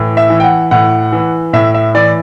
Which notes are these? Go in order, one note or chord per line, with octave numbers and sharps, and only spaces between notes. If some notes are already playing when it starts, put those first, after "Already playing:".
Already playing: A2 E3
E5
E3
G5
F#5
A2 F#5
E3
A2 E5
E5
E3 D5